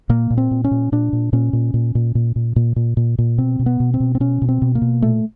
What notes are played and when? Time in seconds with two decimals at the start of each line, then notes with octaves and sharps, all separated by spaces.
0.09 A#2 A#3
0.30 A#2
0.38 C4
0.51 A#2
0.64 C#4
0.71 A#2
0.92 A#2 D4
1.13 A#2
1.33 A#2 C#4
1.53 A#2
1.74 A#2
1.95 A#2
2.15 A#2
2.36 A#2
2.56 A#2
2.76 A#2
2.97 A#2
3.18 A#2
3.38 B2 C4
3.59 B2
3.66 B3
3.80 B2
3.94 C4
4.00 B2
4.15 C4
4.20 B2 C#4
4.42 B2
4.49 C4
4.62 B2
4.75 A#3
4.82 B2
5.02 A#2 A3